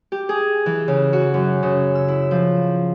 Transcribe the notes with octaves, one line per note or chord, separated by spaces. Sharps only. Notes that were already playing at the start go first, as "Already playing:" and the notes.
G4
G#4
E3
C#3
F#4
F#2
C#3
E6
E4
F3